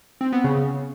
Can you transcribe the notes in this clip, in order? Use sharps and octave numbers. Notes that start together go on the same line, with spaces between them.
C4
B3
C#3